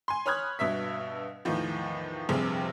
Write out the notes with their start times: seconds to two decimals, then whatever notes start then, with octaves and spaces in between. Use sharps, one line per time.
0.08 G#5 C6
0.26 C#5 B5 D#6 F6 F#6 G#6
0.59 G2 B2 E5 B6
1.45 E2 A2 D#3 F3
2.29 F1 A#1 G2 C3 C4 G#4